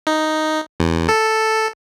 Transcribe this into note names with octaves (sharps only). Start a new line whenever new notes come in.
D#4
E2
A4